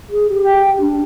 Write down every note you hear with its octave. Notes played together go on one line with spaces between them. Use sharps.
G#4
G4
G5
G4
D4